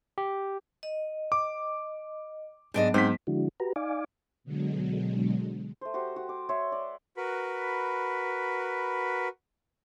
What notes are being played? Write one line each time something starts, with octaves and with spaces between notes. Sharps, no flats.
G4
D#5
D6
G#2 F#3 B3 D4 D#5
G#2 C4 B6
D3 F3 G#3 D4 E4 F#4
F#4 G4 B4 A#5
D#4 D5 F5 G#5 D6
B2 D3 F#3 G#3
A3 C5
F#4 G4 C5
F#4
D6
C#5 E5 C6
D5
F#4 A#4 B4 B5